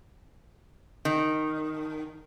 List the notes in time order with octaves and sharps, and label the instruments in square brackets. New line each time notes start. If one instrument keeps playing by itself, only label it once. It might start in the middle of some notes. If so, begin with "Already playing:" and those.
[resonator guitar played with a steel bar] D#3